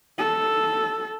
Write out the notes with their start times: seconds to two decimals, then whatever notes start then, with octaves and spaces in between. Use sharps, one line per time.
0.19 A4